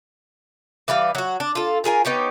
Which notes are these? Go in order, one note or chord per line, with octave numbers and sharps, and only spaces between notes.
E3 G3 B4 F5
F#3 F#4
D4
F4 A4
F4 G#4 A#4 G#5
B3 D#4 G4 C#5